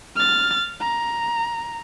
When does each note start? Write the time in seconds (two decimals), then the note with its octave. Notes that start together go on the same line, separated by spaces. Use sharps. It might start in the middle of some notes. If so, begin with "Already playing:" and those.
0.16 F6 A6
0.80 A#5